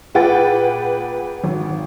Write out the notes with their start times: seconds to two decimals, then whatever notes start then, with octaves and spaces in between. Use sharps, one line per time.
0.15 A#2 G#4 B4 F#5 G5 A6
1.44 G#1